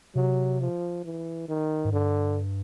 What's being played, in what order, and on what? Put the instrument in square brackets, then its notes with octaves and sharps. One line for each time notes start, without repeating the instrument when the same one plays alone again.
[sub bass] C3 [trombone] F#3
[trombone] F3
E3
D#3
[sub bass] G#2
[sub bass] G2 [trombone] D3